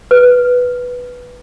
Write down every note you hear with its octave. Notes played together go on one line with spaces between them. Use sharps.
B4